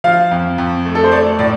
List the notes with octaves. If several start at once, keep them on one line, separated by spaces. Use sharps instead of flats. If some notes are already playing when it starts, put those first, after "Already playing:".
F3 F5
F2
F2
A3
A4
C5
A3 D5
A2 D5